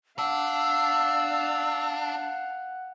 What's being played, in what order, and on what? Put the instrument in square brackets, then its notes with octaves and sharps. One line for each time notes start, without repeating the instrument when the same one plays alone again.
[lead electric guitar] D4 [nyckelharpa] F5 [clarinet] F#5 [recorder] E6